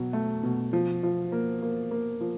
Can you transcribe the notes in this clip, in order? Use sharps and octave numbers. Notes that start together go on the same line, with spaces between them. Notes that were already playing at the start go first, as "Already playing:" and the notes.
Already playing: B2 F#3
A3
B2
F3
F3
A#3
A#3
A#3
F3